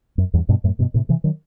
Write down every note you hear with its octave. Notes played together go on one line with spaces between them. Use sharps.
F#2
E2 G2
G2 B2
F#2 A2
G2 B2
A2 C3
C3 E3
D#3 F#3